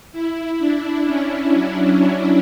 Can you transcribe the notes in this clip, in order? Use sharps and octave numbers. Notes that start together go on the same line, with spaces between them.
E4
D4
C#4
F#3